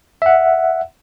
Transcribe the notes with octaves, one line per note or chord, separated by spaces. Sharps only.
E5 F#5